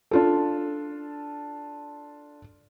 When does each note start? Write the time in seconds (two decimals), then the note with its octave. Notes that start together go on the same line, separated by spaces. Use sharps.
0.11 D4 F4 A4